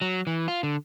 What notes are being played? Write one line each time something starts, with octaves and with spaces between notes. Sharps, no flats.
F#3
E3
F4
D3